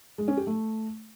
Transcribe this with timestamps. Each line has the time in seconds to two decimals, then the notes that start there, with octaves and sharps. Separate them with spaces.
0.18 G#3
0.28 C#4
0.37 G4
0.47 A3